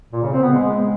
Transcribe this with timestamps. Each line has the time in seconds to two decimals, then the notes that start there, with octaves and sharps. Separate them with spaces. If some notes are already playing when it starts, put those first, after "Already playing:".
0.13 A#2
0.23 C#3
0.32 C4
0.42 B3
0.52 G#3